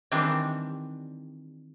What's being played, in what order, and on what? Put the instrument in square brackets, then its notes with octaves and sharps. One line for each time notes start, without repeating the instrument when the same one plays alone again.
[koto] D#3 E3 G3 C4 D4